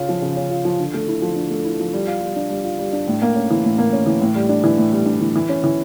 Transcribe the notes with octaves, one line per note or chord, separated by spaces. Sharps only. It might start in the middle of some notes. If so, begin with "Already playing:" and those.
Already playing: C#3 C#4 F4
F3
C#3
C#4
F4
F3
D3
A3
E4
F3
D3
A3
E4
F3
G3
F4
G3
D4
G3
F4
G3
D4
A2
A#3
C#4
E3
A2
A#3
C#4
E3
A2
G3
D4
E3
A2
G3
D4
E3
E3
C#4
E3